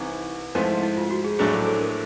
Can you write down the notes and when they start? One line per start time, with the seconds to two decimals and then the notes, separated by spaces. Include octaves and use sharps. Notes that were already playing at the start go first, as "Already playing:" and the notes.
Already playing: C2 C3 E3 D#4
0.55 G#2 F3 A3 C4 E4
0.69 E4
0.83 E4
0.97 F4
1.11 F#4
1.24 G#4
1.39 A#1 A2 F#3 A3 D4 G#4
1.53 A4
1.66 A4
1.81 A#4